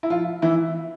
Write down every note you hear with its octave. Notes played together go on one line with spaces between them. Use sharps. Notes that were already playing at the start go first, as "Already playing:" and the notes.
E4
F3 F4
E3 E4